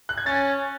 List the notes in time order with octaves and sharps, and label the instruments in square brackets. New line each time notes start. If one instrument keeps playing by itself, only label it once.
[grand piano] F#6
G#6
[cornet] C#4 [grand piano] A6